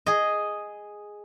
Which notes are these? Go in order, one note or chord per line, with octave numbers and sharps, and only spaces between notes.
G#4 D#5